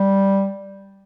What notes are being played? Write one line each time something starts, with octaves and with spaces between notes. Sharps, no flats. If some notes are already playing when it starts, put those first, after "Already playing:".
Already playing: G3